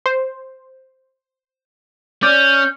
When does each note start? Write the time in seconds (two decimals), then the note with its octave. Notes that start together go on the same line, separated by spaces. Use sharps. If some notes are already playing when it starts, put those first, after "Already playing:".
0.06 C5
2.23 C#4 D5 G6